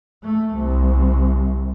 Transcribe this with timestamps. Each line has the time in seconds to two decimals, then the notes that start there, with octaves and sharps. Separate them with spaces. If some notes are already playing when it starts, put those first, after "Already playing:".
0.23 A3
0.55 C2